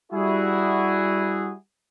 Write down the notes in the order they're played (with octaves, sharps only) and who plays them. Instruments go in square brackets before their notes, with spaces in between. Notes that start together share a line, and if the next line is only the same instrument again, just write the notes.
[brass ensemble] G3 E4 F#4 G#4